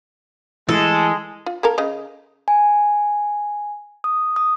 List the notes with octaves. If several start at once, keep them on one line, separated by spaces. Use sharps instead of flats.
E3 G#3 A3 A4
F4
A#3 A4 A#4
C#3 D#5
G#5
D#6
D#6